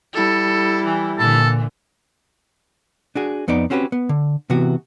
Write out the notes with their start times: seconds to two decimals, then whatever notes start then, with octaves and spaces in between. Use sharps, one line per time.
0.14 G3 E4 A4
0.85 E3
1.18 A#2 D3 E3 A4
3.15 D4 F#4 G#4
3.48 F2 B3 D#4 D5
3.70 C4 C#4 F#4 G4 A#4 B4
3.92 B3
4.09 D3
4.50 C3 E3 B3 F#4